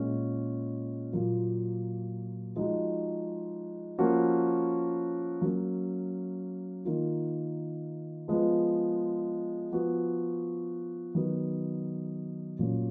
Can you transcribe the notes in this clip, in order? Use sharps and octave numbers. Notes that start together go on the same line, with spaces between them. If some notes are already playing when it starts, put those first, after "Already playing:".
Already playing: A#2 G#3 C#4
A#2 F#3 A#3 F4
F3 G#3 D#4 F#4
F3 A#3 C#4 F#4
F#3 A#3 C#4
D#3 A#3 F4
F3 G#3 B3 F4
F3 B3 F#4
D#3 F#3 B3
A#2 F#3 C#4